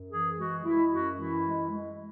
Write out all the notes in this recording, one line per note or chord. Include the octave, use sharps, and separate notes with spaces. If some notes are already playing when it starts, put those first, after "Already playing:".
Already playing: F#2
E3 G#4
G#3 F#4
G#3 E4
F#2 F#4
E3 E4
G#3
G#3